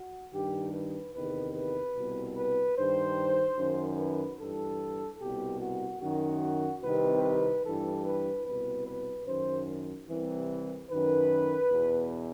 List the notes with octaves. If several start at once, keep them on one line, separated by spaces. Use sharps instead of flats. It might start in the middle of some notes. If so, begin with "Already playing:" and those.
Already playing: F#4
G2 D#3 G4
B4
E2 C3 D#3 B4
B4
C2 B2
B4
G2 D#3 C5
F#2 D#3
B4
G2 E3 A4
C2 B2 G4
F#4
F#2 D#3 F#4
C2 C3 D#3 B4
B4
G2 E3 A4
B4
C2 B2 B4
B4
F#2 D#3 C5
C2 C3 E3
F#2 D#3 B4
E2 B2